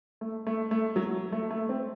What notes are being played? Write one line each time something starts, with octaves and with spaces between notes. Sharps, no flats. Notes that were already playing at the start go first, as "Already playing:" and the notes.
A3
A3
A3
F#3
A3
A3
C4